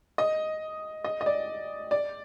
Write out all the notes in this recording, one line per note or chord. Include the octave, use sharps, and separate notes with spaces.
D#5
D#5
D#5
D5
D5